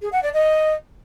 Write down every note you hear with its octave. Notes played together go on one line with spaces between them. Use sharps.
G#4
F#5
D5
D#5